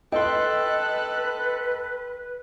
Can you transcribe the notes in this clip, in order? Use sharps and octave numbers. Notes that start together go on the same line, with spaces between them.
A4 B4 D#5 G5 C6 F#6